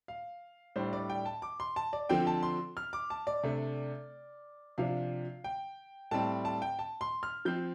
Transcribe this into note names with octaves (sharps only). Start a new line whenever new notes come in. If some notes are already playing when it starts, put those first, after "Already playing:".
F5
A2 G3 D4 C5
D5
G5
A5
D6
C6
A5
D5
D3 F3 C4 G5
A5
C6
F6
D6
A5
D5
C3 A3 D4
C3 F3 D4 F5
G5
A2 G3 C4 A5
A5
G5
A5
C6
F6
F3 C4 G6